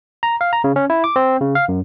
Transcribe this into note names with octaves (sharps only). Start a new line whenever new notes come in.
A#5
F5
A#5
C#3
C#4
E4
D6
C4
C#3
F5
F#2